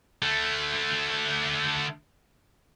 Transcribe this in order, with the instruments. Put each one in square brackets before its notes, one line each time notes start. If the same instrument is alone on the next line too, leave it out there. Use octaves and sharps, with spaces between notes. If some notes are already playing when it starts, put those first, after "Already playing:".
[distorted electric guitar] D3 A3